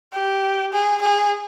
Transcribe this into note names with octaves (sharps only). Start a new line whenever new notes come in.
G4
G#4
G#4